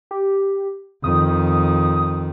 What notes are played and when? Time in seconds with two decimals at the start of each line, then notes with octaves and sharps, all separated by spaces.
0.11 G4
1.04 F2 D#3 D#6